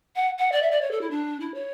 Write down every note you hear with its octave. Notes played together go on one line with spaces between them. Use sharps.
F#5
F#5
D5
E5
D5
C#5
A4
E4
D4
E4
C#5